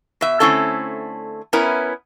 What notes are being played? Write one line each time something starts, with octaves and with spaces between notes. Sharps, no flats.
B2 E5
D3 A3 C4 C#4 E4 A4
B3 C#4 E4 A#4